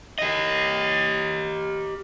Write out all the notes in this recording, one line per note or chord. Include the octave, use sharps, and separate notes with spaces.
G4 D#5